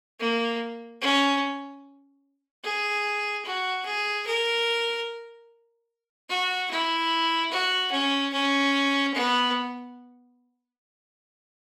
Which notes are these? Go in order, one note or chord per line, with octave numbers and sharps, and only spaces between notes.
A#3
C#4
G#4
F#4
G#4
A#4
F#4
E4
F#4
C#4
C#4
B3